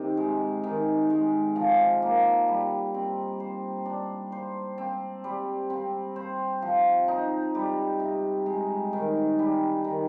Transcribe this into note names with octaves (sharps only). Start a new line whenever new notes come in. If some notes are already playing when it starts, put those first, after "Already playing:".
Already playing: C3 D#3
G#3
D#3
G#3
F3
A#3
G3
C4
C5
D4
C5
C4
G3
C4
C5
F3
D#4
G3
C3
G#3
D#3
G3
D#3